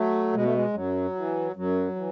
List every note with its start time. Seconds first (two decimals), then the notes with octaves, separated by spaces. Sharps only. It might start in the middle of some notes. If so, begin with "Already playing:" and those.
Already playing: F#3 A3
0.33 B2 G#3
0.44 A3
0.54 G#3
0.73 F#2 F#3
1.15 E3
1.56 F#2 F#3
1.96 E3